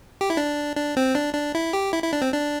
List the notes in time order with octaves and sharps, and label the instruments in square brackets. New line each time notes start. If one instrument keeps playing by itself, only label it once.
[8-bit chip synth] G4
E4
D4
D4
C4
D4
D4
E4
G4
E4
E4
D4
C4
D4